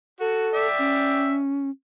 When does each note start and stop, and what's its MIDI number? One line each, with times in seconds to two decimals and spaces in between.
0.20 0.49 66
0.20 0.67 69
0.54 1.38 74
0.54 1.38 76
0.54 1.38 79
0.79 1.70 61